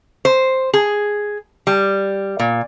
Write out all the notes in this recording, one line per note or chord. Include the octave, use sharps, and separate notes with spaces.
C5
G#4
G3
A#2